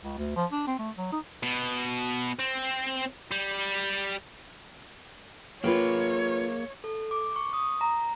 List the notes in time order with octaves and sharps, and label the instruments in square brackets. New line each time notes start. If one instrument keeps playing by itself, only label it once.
[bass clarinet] C#2
D2
F3
D4
C4
A3
F#3
D#4
[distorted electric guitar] B2
C4
G3
[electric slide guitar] A#3 G#4 A#4 [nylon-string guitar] F4 B4 G5 [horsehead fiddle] C#5
[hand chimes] A4
D6
C#6
D#6
A#5